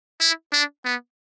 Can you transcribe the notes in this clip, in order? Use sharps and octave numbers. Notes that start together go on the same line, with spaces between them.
E4
D4
B3